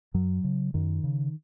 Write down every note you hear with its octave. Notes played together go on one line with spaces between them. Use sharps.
F#2 F#3
C#3
F#2 D#3
C#3